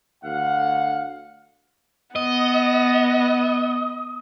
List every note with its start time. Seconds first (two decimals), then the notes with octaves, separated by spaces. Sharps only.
0.23 D2 F5 F#5
2.16 B3 D#5